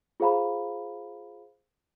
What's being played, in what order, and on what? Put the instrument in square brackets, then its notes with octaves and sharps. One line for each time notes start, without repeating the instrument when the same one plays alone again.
[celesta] F4 G#4 C5 F5 A#5 B5